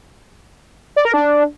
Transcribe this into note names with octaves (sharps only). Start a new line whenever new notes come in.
D5
A#4
D4